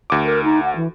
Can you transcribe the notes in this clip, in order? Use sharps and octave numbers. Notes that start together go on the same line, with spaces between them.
D2 D6
A#4
D#4
F#5
E3